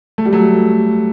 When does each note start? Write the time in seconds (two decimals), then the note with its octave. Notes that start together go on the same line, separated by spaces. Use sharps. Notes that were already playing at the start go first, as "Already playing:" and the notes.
0.18 A3
0.25 G3
0.33 F#3 A3